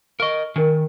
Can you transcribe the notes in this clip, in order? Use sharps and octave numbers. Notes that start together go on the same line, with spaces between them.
A#4 D#5 F5 C#6
D#3 D4 A#4